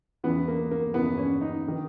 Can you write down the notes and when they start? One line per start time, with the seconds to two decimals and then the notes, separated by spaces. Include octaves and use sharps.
0.24 E2 C#3 E3 B3
0.48 A#3
0.71 A#3
0.94 E2 C#3 E3 B3
1.18 C#4
1.41 D#4
1.68 D#3